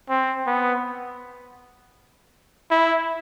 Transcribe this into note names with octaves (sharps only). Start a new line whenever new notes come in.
C4
B3
E4